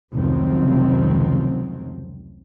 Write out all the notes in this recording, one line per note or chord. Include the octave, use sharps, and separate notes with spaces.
F1 C#2 D#3 F3 F#3 C4